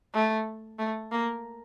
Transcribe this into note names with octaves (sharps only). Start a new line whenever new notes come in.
A3
A3
A#3